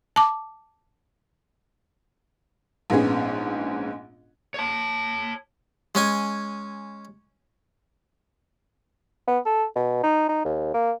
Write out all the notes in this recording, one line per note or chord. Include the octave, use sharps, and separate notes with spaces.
A5 D6
A#1 G#2 B3 C#4 G#4
C#5 A5
G#3 C#4 G#5
B3
A4
B2
D#4
D#4
D#2
A#3